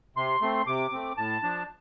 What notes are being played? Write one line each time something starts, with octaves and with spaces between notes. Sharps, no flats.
C3 C6
A3 C4
C3 D6
A3 C4
A2 A5
F3 D4